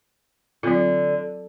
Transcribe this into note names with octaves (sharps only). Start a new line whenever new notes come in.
D3 F#3 C4 F4